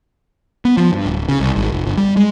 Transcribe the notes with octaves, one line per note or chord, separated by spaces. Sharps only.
B3
F3
G2
D1
C#3
C2
G#1
F1
G1
G3
G#3